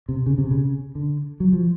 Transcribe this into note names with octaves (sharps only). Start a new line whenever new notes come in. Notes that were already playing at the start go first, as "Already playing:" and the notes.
C3
C#3
C3
C#3
D3
F#3
F3